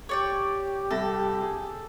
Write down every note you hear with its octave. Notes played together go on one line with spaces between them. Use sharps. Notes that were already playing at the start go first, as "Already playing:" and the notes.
G4 C#5 D5 G5
C2 A4 E5 A#6
G#4